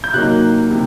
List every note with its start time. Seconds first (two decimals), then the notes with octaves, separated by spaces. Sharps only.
0.04 G6
0.14 C3 F#3 A#3 D#4 F#6
0.70 C3